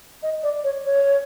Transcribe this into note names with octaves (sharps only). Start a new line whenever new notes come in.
D#5
D5
C#5
C#5